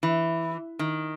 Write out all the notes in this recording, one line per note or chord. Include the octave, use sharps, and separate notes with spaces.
E3
D#3